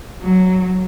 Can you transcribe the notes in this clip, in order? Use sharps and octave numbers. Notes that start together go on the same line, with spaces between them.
F#3